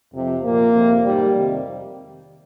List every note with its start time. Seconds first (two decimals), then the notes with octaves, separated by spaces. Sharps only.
0.13 F2 C3 F3
0.43 A#2 F3 A#3
0.74 F2 C3 F3
1.05 G#2 D#3 G3
1.35 F2 C3 D#3